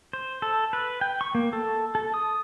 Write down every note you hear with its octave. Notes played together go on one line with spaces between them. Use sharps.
C5
A4
B4
G5
C#6
A#3
A4
A4
D#6